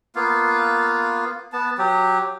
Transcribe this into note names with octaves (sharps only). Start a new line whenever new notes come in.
A#3 B3 F4 F5
B3 A5
F#3 G4